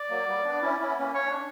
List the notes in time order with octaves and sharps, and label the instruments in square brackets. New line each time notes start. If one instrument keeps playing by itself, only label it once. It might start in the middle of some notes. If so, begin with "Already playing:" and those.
Already playing: [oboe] D5
[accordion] F#3 A#3
G3 B3
B3 D4
C#4 E4
C#4 E4
B3
A#3 C#4
[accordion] C#4 [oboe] C#5
[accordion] D4